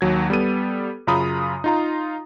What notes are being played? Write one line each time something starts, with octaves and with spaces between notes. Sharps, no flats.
D#2 F#3 G#6
G3 B3 A4 D#7
F#2 C#3 F4 A#5 B5 D#6
D#4 F4 A#5